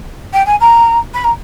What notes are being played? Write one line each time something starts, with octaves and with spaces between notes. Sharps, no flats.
G5
G#5
A#5
B5
A#5